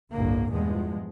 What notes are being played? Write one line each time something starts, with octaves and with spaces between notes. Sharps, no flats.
G1 C2 A2 D3 A#3
E2 G2 A#2 F3 G#3